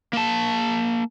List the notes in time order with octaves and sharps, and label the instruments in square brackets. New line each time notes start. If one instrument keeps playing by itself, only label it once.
[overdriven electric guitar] A#3 A5